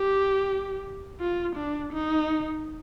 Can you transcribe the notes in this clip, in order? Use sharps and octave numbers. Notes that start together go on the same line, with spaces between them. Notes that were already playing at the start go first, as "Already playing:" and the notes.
Already playing: G4
F4
D4
D#4